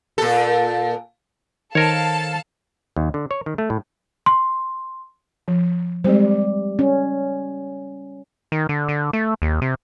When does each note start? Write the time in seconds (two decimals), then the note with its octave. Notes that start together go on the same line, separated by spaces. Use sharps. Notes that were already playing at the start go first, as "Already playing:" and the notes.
0.18 A#2 A4
1.75 D#3 A4 A#4 C5 C#5 F5 A5
2.96 D#2
3.14 D3
3.31 C#5
3.46 D#3
3.58 A3
3.70 A2
4.26 C6
5.48 F3
6.04 G3 G#3 C4 C5
6.79 C#4
8.52 D#3
8.69 D3
8.88 D3
9.13 A3
9.42 D#2
9.62 C3